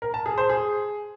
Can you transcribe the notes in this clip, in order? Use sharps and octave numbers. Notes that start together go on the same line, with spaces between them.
A#4
A5
G#4
C5
G#4